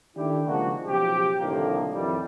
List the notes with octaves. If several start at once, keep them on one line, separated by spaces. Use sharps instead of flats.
D#3 A3 D4 E4 G4
C#3 F3 G#3 A#3 D4 F#4
B1 C#3 F3 G4
C2 A2 D3 D#3 F3 A#3
F2 A2 D#3 E3 G3